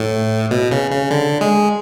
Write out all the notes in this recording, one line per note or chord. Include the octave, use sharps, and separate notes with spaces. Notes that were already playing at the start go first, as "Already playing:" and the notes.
Already playing: A2
B2
C#3
C#3
D3
G#3